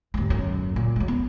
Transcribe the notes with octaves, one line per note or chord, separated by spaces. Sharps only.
D#2 G#2
B1 F#2
A#2
F#3 G#3
B3